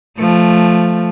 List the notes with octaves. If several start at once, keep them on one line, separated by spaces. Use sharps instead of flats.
F3 A3